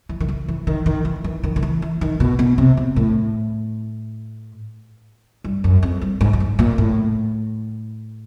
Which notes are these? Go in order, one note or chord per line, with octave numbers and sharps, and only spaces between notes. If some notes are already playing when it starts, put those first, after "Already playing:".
E3
D#3
E3
E3
D#3
D#3
E3
E3
D#3
D#3
E3
E3
D#3
B2
B2
C3
B2
A2
G2
F#2
F2
G2
G#2
G2
G#2
A#2
A2